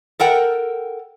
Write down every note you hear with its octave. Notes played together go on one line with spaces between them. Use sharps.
A4 A#4 F#5 G5